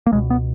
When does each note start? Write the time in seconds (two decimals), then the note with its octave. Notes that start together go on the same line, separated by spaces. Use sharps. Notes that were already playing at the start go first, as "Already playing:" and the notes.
0.07 A#3
0.12 C#2 B2 G#3
0.30 B3